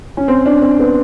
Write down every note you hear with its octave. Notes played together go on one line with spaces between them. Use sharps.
C#4
C4
D4
C4
B3